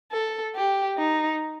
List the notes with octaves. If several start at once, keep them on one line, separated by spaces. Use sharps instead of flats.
A4
G4
D#4